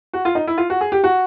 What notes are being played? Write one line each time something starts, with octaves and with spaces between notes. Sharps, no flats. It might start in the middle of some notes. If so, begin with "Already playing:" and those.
F#4
F4
D#4
E4
F4
F#4
G#4
G4
F#4